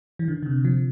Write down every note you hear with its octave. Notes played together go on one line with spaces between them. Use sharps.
E3
D3
D3
C3
F3